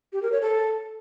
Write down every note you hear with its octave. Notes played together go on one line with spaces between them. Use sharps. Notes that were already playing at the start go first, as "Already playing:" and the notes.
G4
A#4
C#5
A4